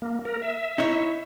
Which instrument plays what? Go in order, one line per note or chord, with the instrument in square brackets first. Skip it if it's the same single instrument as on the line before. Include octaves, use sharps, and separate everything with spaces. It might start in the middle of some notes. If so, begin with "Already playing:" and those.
[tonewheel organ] A#3
A#4
E5
[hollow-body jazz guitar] D#4 E4 C#5